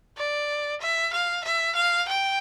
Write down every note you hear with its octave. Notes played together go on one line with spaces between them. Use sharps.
D5
E5
F5
E5
F5
G5